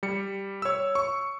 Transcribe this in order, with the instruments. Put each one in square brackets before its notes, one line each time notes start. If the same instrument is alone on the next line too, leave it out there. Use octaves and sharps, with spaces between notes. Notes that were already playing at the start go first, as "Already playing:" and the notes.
[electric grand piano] G3 C#7
C#5 E6
C#6